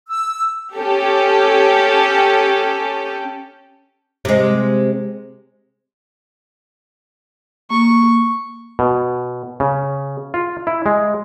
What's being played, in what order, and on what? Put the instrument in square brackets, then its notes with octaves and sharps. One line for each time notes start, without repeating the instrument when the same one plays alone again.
[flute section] E6
[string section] C#4 G4 A4
[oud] C3 G#3
[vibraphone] A#3 [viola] C#6
[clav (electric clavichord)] B2
C#3
F4
E4
G#3